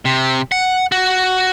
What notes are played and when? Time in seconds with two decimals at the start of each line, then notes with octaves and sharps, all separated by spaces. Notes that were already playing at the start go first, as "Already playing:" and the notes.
0.05 C3
0.52 F#5
0.92 F#4